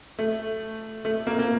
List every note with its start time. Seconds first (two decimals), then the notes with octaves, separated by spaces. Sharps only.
0.19 A3
1.05 A3
1.27 A#3
1.39 A#3